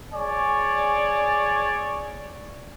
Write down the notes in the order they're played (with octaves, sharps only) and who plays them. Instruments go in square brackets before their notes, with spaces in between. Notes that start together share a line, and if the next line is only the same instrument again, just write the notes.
[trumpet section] G#4 C#5 D5 G#5